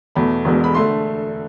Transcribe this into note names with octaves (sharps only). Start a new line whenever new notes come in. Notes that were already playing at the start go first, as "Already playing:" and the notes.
E2 B2 A3 B5
E1 E2 B2 G#3
B5
D3 A3 C6